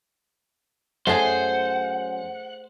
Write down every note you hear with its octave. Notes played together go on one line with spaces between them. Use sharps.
F#2 A3 G#4 C5 F#5 G#5